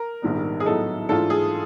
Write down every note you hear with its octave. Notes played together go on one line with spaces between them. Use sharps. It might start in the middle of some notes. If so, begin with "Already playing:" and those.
Already playing: A#4
A#1 G#2 D#3 G3 B3
G#4
A2 F#3 B3 D#4 A4
G#2 E3 A3 D4 F4 A4
G#4